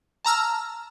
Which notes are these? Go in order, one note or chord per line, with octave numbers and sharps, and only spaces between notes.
A5 A#5 E6 F6